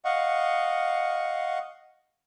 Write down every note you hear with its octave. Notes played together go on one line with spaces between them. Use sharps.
D#5 F5 F#5 C#6